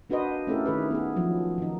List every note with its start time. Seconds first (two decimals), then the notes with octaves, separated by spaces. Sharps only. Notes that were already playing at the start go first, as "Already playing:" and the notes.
0.10 A#3 D4 F#4 B4 C5 D#5
0.47 A3 C#4 E4 G4 A4 A#4
0.65 D#3 G#4 B4
0.91 B3 G#4
1.16 F3 F#3
1.58 D#3 D#4